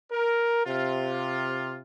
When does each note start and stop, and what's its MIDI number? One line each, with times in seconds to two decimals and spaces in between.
0.11 0.65 70
0.66 1.81 48
0.66 1.81 65